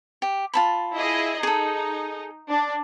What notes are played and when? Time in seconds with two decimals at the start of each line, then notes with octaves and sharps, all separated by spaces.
0.22 G4
0.54 F4 A5 B5
0.95 E4 G#4 D#5
1.43 D#4 G#4 A4
2.49 D4